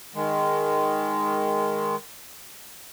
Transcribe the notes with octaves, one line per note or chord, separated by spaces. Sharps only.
D#3 G#3